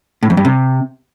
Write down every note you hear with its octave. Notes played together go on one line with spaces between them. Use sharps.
A2
F2
G2
C3